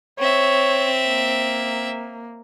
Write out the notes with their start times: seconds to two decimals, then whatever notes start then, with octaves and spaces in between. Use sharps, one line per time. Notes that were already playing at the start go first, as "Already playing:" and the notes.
0.19 C4 C#5 E5
1.08 A#3